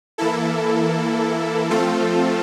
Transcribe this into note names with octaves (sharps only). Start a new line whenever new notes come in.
E3 A#3 E4 A4
F3 A3 C4 F4 A4